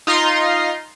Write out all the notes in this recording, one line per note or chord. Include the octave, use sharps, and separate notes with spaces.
D#4 F4 A#5 C6